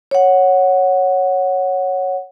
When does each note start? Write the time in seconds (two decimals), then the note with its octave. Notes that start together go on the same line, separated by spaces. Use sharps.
0.11 C#5 F#5